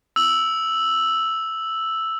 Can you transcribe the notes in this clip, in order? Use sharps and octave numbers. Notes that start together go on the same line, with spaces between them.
E6 F#7